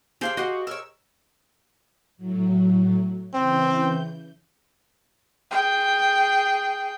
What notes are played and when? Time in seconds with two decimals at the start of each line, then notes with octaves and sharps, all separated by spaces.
0.21 D4 G4 G#4 C5 F5 G#5
0.37 F#4 G4 D#5 F5 F#5
0.67 A#4 C#5 E6
2.17 A2 F#3
3.34 C#3 E3 C4 G6
5.51 G#4 G5